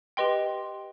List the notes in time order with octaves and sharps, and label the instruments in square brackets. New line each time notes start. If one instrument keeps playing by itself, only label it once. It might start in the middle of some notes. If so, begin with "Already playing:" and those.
[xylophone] G4 B4 D#5 G5 C6